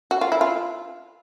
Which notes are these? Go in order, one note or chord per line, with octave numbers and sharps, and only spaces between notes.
F#4
F4
E4
F4